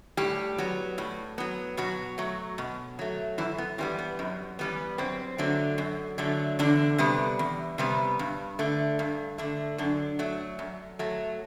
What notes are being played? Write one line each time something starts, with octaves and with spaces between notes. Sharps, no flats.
A2 G3 G4
F#3 B3
A2
F#3 B3
B2 F#3 F#4
F#3 A3
B2
F#3 A3
F#2 E3 E4
B3
E3 G3 B3 C4
B3
F#2
E3 G3 B3
F#2 C4
D3 F#3 A3
F#2
D3 F#3 A3
E2 D3 D4
C3 G3 B3
E2
C3 G3 B3
G2
D3 A3
G2
D3 A3
F#2 D3 D4
F#3 A3
F#2
F#3 A3